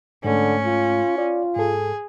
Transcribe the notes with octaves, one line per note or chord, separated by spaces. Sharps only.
G#2 D3 A3 C#4
F4
F4 D5
G#2 G#4 A4